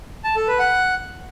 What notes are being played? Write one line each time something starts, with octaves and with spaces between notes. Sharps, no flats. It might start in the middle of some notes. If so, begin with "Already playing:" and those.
A5
A4
B4
F#5